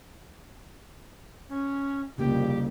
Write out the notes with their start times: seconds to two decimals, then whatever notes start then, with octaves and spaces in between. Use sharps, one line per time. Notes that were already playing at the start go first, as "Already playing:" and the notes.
1.49 C#4
2.18 C2 F2 C#3 A#3 G4